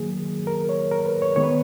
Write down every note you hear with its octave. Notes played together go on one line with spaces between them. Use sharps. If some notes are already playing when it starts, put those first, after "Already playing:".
Already playing: D#3 F#3 A#3 G#4
A#4
C#5
A#4
B4
C#5
D#3 G#3 B3 C#5
B4